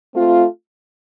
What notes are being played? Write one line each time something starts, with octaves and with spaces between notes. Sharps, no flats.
A3 C4 F4